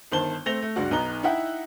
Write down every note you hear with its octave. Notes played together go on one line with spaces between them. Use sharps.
G1 D#3 C5 A5 G7
A3 C4 A#6 F7 G7
A3
C#2 G2 D4 F#4
B1 B3 D#4 A#5 F#6 G7
D#4 E4 E5 F#5 G5